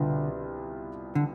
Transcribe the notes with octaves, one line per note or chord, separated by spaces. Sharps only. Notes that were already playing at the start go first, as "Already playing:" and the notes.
Already playing: C2 B2 D3 B3 F4
D3